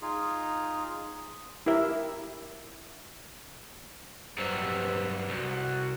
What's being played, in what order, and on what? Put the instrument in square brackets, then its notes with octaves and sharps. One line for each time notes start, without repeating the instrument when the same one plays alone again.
[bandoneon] D#4 F4 G#4
[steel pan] E4 G4 A#4 E5
[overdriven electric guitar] G2 F#3 [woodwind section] C3 B4 E6
[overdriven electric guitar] C2 [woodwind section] F#4